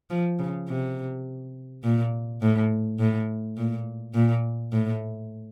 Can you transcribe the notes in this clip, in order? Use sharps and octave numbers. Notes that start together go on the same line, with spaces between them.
F3
C#3
C3
A#2
A2
A2
A#2
A#2
A2